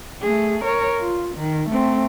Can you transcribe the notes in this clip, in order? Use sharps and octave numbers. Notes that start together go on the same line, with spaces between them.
A3 G#4
A#4 C#5
F4
D#3
A3 C4